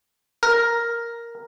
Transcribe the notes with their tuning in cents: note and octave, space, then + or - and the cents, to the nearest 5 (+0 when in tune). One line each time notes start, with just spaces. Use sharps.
A#4 +0